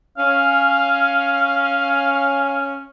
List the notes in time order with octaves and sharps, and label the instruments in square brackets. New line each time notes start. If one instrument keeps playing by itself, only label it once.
[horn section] C#4 [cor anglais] F5